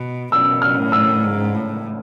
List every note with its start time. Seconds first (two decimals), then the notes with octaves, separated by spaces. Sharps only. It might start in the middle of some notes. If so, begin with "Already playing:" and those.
Already playing: B2
0.32 B2 E6
0.62 F6
0.77 A2
0.92 E6
1.23 G#2
1.54 A2